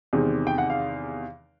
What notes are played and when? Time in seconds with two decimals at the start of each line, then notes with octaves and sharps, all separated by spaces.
0.13 E2 C3 D#3 G#3
0.47 G5
0.58 F#5
0.70 F5